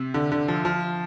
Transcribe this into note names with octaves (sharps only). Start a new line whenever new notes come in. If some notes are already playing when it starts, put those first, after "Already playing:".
Already playing: C3
D3
D3
F3
F3